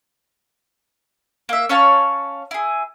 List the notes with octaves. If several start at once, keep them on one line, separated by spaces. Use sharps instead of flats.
A#3 E5
C#4 C#5 F5 A5
E4 G#4